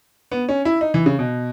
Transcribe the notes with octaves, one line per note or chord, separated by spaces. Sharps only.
B3
C#4
E4
D#4
E3
C#3
B2